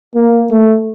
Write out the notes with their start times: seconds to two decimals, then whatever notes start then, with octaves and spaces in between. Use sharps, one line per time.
0.15 A#3
0.51 A3